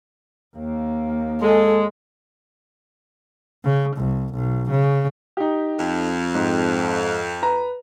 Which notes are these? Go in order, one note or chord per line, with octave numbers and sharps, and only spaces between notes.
D#2 A#3
G#3 A4
C#3
C2
B1
C#3
D#4 G4
F2
G#2
B4 A#5